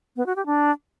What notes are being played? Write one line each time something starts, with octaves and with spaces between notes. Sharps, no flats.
B3
F#4
G4
D4